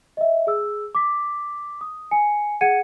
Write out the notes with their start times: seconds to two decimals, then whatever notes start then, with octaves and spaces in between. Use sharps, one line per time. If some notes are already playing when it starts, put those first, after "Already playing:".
0.17 D#5 E5
0.47 G#4 E6
0.95 D6 B6
1.81 D#6
2.11 G#5 C#7
2.61 G#4 F#5 G#6 C#7 D#7